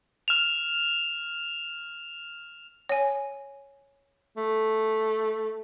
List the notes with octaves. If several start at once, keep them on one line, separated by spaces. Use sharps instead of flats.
F6 E7 F7
C#5 G#5
A3